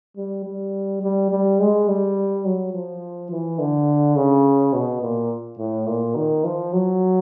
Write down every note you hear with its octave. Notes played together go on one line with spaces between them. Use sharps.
G3
G3
G3
G3
G#3
G3
F#3
F3
E3
D3
C#3
B2
A#2
A2
A#2
D#3
F3
F#3